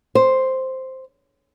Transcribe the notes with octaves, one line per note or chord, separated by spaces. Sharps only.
C5